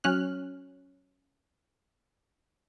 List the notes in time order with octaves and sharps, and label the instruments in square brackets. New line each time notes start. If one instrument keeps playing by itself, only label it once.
[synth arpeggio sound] F#3 C#4 F6 F#6